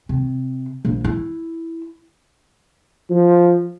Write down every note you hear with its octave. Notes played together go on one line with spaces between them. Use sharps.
C3
A#1
E4
F3